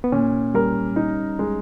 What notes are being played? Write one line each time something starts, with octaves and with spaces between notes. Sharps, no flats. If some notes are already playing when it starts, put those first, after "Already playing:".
B3
A#2 C#4
G3 A#4
D#4
G#3